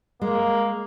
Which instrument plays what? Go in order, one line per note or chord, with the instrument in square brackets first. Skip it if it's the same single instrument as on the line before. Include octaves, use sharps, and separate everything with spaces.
[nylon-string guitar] G#3 [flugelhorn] A#3